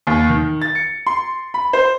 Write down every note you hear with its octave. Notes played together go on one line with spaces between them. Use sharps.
D#2
D#3
A6
C#7
C6
B5
C5